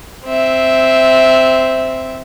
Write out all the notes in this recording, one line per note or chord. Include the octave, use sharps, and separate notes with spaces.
C4 E5